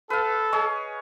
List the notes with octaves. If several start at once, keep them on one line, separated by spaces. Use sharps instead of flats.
A4 B4 F5
G#4 C#5 D#5